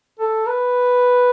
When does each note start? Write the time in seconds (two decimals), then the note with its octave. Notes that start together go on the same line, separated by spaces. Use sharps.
0.19 A4
0.47 B4